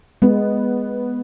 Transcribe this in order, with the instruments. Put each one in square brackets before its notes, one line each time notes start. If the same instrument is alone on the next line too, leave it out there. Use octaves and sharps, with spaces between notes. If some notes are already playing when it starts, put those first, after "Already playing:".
[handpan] G#3 [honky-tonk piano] B3